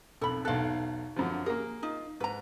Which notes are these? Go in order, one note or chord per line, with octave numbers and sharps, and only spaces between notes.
B1 F2 A4 B5
B1 E2 A4 F5 F#6
F#2 D3 F3
A#3 G#4 A#4
D#4 F4
G#2 B4 A#5